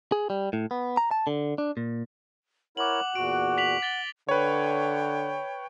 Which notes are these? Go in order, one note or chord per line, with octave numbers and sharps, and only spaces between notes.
G#4
G3
A2
B3
A#5
A5
D3
D4
A#2
E4 A#4 C#5 F#5 D6 F#7
E2 A#2 F#4 D7
B6 F7 F#7
A6 G7
D3 B4 C#5 G5